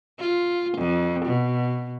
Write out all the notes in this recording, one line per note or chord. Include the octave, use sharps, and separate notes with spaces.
F4
F2
B2